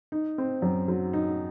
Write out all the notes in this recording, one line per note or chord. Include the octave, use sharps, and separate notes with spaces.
D#4
C4
F#2
F#3
D#4